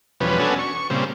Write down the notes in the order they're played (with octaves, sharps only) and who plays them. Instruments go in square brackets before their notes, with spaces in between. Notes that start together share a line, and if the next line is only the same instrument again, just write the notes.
[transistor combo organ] E2 B2 F3 G3 C#4 B4
B3 C#4 D4 F#4 A4 G#5
C#6
A#2 C#3 G3 C4